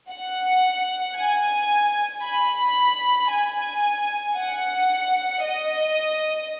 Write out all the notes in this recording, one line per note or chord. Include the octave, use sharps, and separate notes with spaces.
F#5
G#5
B5
G#5
F#5
D#5